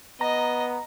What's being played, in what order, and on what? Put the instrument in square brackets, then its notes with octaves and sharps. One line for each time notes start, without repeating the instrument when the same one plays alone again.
[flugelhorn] B3 [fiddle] D#5 [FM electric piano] A#5